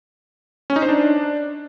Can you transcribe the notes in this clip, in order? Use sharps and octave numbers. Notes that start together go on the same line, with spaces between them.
C#4
D#4
C5
D4